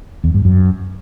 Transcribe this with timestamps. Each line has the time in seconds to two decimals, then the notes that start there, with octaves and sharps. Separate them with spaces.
0.24 E2
0.34 G2
0.45 F#2